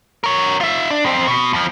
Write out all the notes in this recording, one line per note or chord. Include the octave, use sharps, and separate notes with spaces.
A#4 C#5
F4 E5
D4
F2 C4
B2
F2 F3